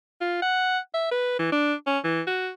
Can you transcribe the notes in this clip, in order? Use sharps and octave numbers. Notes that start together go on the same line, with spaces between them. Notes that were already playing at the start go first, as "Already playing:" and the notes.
F4
F#5
E5
B4
E3
D4
C#4
E3
F#4